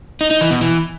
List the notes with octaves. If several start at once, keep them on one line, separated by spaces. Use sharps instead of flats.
D#4
D#4
E3
B2
E3